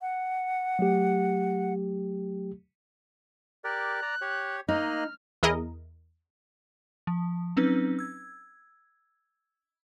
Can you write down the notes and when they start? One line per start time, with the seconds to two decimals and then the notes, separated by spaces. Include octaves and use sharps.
0.02 F#5
0.79 F#3 A3 G4
3.64 G4 A#4 D5 F#6
4.02 D5 A#5
4.21 G4 C#5
4.68 A#3 D#4 D#5 F6 F#6
5.43 E2 E4 G#4 A#4 D#5
7.07 F3
7.57 F#3 C4 C#4 D#4 B4
7.99 E6 G#6